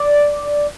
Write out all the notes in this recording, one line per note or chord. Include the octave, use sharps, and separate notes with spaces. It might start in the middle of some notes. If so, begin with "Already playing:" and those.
Already playing: D5